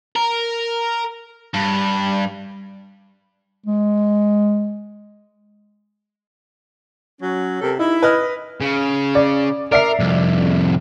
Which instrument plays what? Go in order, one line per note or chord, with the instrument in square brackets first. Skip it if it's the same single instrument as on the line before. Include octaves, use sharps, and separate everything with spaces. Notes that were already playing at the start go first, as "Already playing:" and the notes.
[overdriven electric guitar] A#4
G2
[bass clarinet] G#3
[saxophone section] F#3 C#4
C3 A4 A#4
[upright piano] D#4 [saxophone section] E4
[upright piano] B4 D#5 F6
[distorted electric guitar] C#3
[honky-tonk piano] D5
[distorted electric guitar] A#4 [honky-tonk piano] D5 E5 C7
[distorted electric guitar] C2 F2